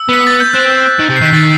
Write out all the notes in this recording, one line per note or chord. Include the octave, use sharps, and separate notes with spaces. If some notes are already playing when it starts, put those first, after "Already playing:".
Already playing: E6
B3 B6
A6
G6
C4 F#6
D#3
C3
C7
D#3
B6
D#3 A6